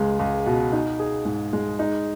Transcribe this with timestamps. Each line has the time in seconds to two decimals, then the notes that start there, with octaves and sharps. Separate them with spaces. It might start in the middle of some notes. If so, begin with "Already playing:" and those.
Already playing: C#2 G#3
0.19 C#2
0.46 B2
0.72 D#4
0.99 G#4
1.25 G#2
1.53 G#3
1.79 D#4